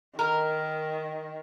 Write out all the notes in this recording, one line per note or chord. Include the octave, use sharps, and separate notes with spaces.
D#3 A#4